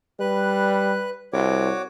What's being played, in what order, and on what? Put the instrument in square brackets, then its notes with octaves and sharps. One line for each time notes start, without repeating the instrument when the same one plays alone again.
[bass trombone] G3 [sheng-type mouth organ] B4 F#6
[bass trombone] C2 [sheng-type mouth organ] F#4 C#5 D6